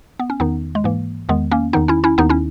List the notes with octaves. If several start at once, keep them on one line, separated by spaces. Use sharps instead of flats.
B3
C#4
E2 D#3 B3 D#4
G#3
G#2 E3 A#3
E2 D#3 G#3 B3
A#3 C#4
E2 D#3 B3 D#4
C#4 E4
C#4 E4
D#2 D#3 B3 D#4
C#4 E4